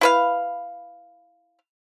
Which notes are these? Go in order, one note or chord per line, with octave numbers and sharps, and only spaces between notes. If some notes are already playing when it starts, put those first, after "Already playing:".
E4 B4 F5